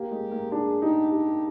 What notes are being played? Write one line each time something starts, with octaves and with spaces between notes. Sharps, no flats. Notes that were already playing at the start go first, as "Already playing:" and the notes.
Already playing: A#3 G4
G#3
A#3
D4 G#4
D#4 G4
G4